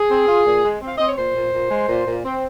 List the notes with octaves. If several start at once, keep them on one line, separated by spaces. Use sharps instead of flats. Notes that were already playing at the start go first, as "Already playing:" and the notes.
Already playing: G#4
C4
F4
A#2
G#3
C4
F5
C4 D#5
C#5
A#2 C5
A#2
A#2
G#3
A#2
A#2
C4